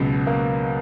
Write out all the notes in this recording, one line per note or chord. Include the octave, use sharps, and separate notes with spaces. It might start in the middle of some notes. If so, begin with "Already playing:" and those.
Already playing: C#2 B2 F#3
A#3